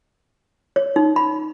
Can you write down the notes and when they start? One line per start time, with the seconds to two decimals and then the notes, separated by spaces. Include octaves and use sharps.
0.76 C#5
0.96 D#4
1.16 B5